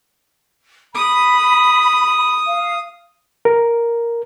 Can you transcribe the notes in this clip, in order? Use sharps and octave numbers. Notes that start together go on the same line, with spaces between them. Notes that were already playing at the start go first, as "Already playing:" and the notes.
B5 D#6
F5
A#4